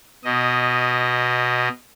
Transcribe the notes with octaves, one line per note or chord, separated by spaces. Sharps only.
B2 D#5